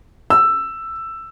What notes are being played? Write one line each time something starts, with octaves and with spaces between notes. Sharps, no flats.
E6